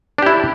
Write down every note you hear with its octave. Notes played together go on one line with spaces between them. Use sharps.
D4 E4 G4